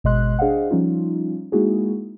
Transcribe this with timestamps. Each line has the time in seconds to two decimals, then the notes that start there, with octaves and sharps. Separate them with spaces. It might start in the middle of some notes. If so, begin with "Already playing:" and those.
0.04 G#1 B2 G#3 D#5 C6 F#6
0.39 D4 G#4 C5 D#5 F5 F#5
0.71 F3 G3 C#4 D#4 F4
1.52 G#3 A#3 D#4 E4 F#4 G#4